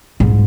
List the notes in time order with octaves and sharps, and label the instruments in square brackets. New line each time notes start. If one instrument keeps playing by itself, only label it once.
[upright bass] G#2